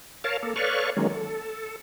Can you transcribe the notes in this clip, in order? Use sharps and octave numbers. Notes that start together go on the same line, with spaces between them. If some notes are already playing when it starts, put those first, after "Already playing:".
A#4 C#5 F5 A5
A#3 A4
A4 B4 C#5 D5 F5 C#6
D#3 F#3 G#3 A#3 C#4
A4